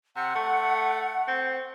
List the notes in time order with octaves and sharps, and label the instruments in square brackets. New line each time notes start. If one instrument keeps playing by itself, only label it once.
[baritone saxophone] C3 [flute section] F#5
[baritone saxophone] A3
C4